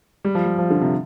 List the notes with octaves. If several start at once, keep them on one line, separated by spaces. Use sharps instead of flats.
G3
F3
G3
F3
D3
C3